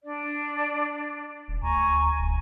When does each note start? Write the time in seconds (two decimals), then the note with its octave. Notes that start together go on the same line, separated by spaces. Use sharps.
0.04 D4 D5
1.48 D#1
1.62 D2 G#5 A#5 C#6
2.19 D#1